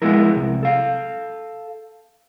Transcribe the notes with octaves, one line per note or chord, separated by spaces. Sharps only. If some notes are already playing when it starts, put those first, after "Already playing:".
F3 G#3 B3 E4 A#4
C2
A4 F5